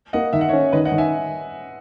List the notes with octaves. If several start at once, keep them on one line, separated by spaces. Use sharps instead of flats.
A#3 D#5 F#5
D#3 E5
F#5
C#5 E5
C#4
D#3 B4 D#5
D#5 F#5
D#3
E5 G#5